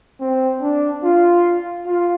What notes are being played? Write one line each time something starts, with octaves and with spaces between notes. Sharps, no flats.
C4
D4
F4
F4